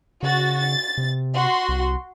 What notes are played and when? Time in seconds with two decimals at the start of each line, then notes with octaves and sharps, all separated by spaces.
0.23 C#3 F#4 A6
0.59 A6
0.98 C3
1.34 F#4 C6
1.69 C2